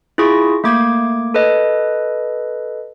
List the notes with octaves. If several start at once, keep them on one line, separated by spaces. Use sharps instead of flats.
E4 F4 G#4 C#6 A#6
A3 A#3 D6 G#6
A4 B4 D#5